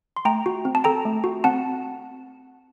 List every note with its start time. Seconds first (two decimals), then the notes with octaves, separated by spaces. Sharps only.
0.16 C6
0.25 A3 G5 A#5
0.46 F#4
0.65 C4
0.75 A5
0.84 A4 G5 A#5
1.05 A3
1.24 F#4
1.44 C4 F#5 A5